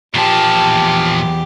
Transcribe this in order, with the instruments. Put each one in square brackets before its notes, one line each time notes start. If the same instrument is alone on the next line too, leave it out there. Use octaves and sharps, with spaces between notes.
[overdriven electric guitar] E2 A5 [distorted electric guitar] A#2 F3 [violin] G4